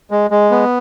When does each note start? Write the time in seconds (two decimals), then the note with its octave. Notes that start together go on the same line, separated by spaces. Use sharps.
0.11 G#3
0.31 G#3
0.51 B3